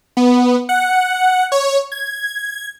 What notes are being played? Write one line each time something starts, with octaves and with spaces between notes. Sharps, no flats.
B3
F#5
C#5
G#6